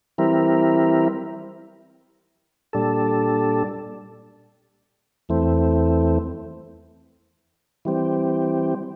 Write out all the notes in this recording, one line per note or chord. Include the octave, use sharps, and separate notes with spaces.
E3 G3 C4 E4 A#4
A#2 G3 D4 A4
E2 E3 A3 C4
E3 G3 C4